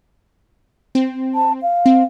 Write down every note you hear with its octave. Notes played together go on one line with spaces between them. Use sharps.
C4
A5
F5
C4